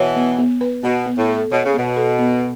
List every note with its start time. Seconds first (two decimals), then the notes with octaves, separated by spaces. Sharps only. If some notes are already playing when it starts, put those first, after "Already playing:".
Already playing: B2 E3 C#5
0.16 B3
0.39 B3
0.61 B4
0.83 B2 B3
1.06 B3
1.17 A2
1.29 A4
1.52 B2 C#5
1.65 C#3
1.74 B2 B3
1.96 A4
2.19 B3